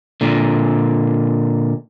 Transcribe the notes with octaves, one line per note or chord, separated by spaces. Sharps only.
A#2 D3